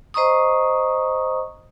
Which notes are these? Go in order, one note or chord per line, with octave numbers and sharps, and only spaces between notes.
C5 D#5 A#5 C#6 D#6